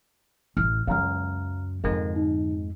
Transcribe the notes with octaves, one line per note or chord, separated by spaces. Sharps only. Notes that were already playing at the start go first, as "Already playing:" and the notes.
A1 F6
C#2 F#2 F#3 G#3 F5 A#5 F6
F2 G#2 D3 G#3 A#4
D#4